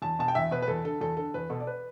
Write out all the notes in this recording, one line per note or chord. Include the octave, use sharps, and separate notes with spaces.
E2 A5
B2 A5
G5
E2 E5
B2 B4
B4
E2 A4
D3 A4
E2 A4
D3 A4
E2 B4
B2 A4
D5
B4